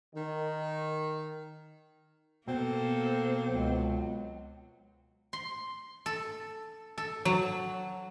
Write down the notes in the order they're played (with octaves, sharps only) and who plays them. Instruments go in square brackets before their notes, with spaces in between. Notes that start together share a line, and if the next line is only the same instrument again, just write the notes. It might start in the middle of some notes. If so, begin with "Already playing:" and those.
[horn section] D#3
[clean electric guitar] B2 [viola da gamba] A#3 A4 [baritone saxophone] C4
[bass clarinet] C#2 [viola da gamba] F#3
[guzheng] C6
A4
A4
F#3